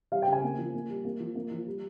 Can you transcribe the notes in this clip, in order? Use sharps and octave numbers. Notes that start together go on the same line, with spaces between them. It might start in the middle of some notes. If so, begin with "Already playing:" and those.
G3 F5
G5
C#3 G#5
A#3
F3
A#3
G3
A#3
F3
A#3
F3
G3